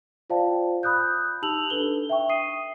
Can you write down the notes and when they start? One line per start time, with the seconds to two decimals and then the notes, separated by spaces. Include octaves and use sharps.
0.30 F4 C5 D5 F5 G5 A5
0.83 B5 D#6 F#6 G6
1.42 D#4 G4 A5 E6 F7 F#7
1.70 D4 A4 B4 G7
2.09 E5 G5 C#6
2.29 D#6 C7 D#7